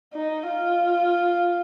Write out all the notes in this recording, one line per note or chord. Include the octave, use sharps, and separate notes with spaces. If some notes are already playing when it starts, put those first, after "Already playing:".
D#4
F4